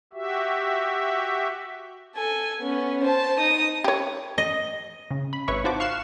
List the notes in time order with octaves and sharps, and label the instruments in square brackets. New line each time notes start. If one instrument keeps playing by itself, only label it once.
[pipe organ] F#4 G4 E5
[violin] A4 G#5
B3 C#4
C5 A5
D#4 D#6
[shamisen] G4 C#5
[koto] D#5
[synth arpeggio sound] C#3
B5
G#1 B4 C#5 E5 B5 C#6
D#4 F4 F#4 C5 A5 D6
F5 C#6 F6 F#6 C7 E7